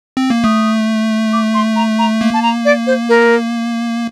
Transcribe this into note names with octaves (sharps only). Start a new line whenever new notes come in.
C4
A#3
A3 D#6
D6
C6
A#5
A#5
A#3
A5
A#5
D5
C5
A#4